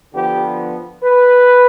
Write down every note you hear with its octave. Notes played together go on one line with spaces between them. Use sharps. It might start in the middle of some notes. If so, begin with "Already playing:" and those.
D3 F3 B3 G4
B4